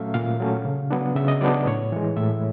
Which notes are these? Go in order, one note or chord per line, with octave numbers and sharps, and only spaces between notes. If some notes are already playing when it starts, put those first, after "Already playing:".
Already playing: A#2 F#3 A3 C#4 E5 F5
A#2 F5
F#3 A3 C#4
C#3
F#3 B3 D4
C#3 E5
D#5
F#3 B3 D4 D5
A2 C#5
E3 G#3
A2 E5